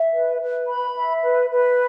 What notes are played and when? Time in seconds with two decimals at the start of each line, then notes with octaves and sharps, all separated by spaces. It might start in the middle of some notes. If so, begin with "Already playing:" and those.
Already playing: E5
0.13 B4
0.40 B4
0.68 B5
0.95 E5
1.22 B4
1.50 B4